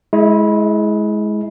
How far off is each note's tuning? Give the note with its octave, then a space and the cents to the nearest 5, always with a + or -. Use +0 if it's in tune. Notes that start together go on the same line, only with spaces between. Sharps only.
G#3 +20 E4 -15